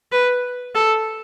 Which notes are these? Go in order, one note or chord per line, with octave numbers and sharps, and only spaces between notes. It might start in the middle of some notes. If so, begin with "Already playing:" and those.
B4
A4